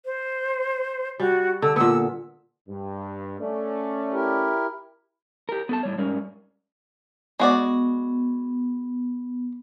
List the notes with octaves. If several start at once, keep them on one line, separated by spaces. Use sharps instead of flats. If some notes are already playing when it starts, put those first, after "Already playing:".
C5
G3 F#4
D3 E6
A#2 B3 E6
G2
A3 C#4 D5
E4 G4 A#4
G4 A#4
B3 A4 A5
A2 G3 C#5
G#2 G3 C#4 A#4
G#3 B3 F#4 D5